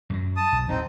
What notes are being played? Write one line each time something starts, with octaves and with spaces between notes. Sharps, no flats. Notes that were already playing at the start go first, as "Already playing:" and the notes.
F#2 F3 F#3
A5 D#6
B1
D1 F#3 C4 D#4